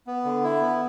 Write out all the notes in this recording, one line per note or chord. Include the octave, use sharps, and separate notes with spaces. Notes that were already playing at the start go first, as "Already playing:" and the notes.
B3
D3
E4
B3